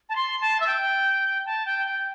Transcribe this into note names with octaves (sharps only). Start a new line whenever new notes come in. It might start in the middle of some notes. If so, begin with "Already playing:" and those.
A5
C6
A5
E5
G5
A5
G5
G5